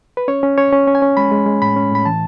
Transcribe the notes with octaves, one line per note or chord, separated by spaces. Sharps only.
B4
C#4 C#5
C#4
C#4 C#5
C#4
C#4
G#5
C#4
G#3 B5
G#3
G#3
A2 B5
C#4
A2 B5
E3 A5